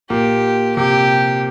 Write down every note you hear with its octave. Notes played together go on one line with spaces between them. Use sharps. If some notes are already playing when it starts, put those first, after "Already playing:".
A#2 G4
C3 G4